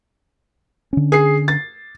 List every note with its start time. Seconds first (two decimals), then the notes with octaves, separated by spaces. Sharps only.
0.93 D3 C#4
1.12 G#4 C7
1.48 A6